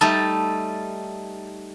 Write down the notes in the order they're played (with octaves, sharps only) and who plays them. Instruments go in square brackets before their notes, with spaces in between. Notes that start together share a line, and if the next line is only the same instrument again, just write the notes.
[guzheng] G3 A3 D#4 A4